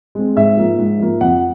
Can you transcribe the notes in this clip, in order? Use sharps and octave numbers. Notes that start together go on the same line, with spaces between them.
G#3 C4
G#2 E5
F3 A#3
G#2
F3 A#3
F2 F#5